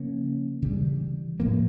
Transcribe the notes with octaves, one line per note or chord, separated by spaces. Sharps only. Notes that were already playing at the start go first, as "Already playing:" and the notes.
Already playing: C#3 F3 A#3 C#4
C#3 E3 G3
A2 F3 A#3